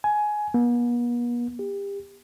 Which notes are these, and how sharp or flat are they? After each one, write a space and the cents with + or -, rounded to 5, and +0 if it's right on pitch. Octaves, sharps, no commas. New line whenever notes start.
G#5 +15
B3 -45
G4 +30